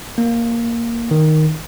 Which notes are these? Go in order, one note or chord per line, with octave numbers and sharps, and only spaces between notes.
A#3
D#3